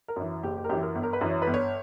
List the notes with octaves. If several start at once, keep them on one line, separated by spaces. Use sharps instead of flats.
A#4
F#2 E3
F#1 G4
G4
A#4
F#2 E3 G4
A#4
G1
A#4
B4
F#2 E3
C#5
B4
G1
C#5